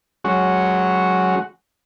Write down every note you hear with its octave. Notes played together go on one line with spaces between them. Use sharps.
F#3 G#3 C#4 F#4